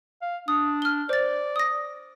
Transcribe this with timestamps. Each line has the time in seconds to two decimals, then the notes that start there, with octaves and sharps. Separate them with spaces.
0.22 F5
0.48 D4 D#6
0.82 F6 G7
1.09 C5 D5 A6
1.56 D#6 A#6